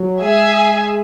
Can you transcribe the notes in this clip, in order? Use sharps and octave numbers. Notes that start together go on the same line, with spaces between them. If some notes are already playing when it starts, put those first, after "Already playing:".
Already playing: F#3
G#3 G#4 E5 G#5